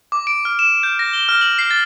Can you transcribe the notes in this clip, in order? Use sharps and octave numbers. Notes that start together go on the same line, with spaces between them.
D6
D7
F6
E7
G6
A#6
G7
F6
F#7
C7
A6